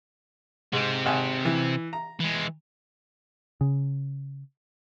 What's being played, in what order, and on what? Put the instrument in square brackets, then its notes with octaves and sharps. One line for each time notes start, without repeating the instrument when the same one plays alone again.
[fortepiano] G#2 [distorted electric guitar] C3 C4
[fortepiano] G#1 F#5 G#5
E3
A#5
[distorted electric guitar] E3 G#3
[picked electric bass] C#3